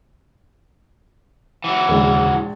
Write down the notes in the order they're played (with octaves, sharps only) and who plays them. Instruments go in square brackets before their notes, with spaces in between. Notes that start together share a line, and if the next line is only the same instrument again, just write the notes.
[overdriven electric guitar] E3 F#3
[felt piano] A#1 G#2 [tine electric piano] D#2 C#3